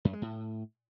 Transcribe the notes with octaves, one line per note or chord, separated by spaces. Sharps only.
F#2
G#3
A2